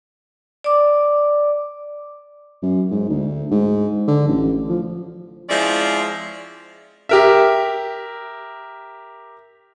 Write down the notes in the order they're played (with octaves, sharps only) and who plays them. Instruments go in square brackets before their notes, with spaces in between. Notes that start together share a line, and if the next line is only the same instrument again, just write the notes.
[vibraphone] D5 D6
[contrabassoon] F#2
G#2
D2
G#2
D3
A1
F3
[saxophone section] F3 G#3 C4 C#4 E4 D5
[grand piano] G4 A#4 E5